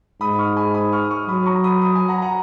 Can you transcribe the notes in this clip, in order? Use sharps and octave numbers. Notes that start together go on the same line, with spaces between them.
G#2 B5 D#6
C#6 F6
G#5 B5
B5 D#6
C#6 F6
D#6
C#6 F6
F#3 B5 D#6
A#5 C#6
B5 D#6
B5 D#6
G#5 B5
F#5 A#5
F#5 A#5